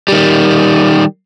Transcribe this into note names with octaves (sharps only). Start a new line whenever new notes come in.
D#3 G3